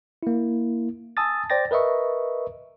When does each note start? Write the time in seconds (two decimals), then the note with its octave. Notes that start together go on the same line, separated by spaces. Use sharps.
0.23 A#3 E4
1.17 G#5 A5 D#6 E6 A6
1.50 C5 D5 G5 A6 A#6
1.71 A#4 B4 D#5 E5 C#6